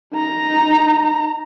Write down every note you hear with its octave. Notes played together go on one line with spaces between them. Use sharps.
D#4 A#5